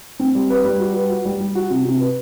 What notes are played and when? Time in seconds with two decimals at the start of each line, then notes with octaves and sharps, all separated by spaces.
0.20 C4
0.35 G3
0.50 B4
0.65 G3
0.80 F#4
0.95 B4
1.09 F#4
1.25 G3
1.40 G3
1.55 F#4
1.70 C3
1.85 C3
2.00 B4